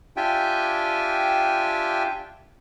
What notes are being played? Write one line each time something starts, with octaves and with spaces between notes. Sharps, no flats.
D4 F4 G4 E5 G5 G#5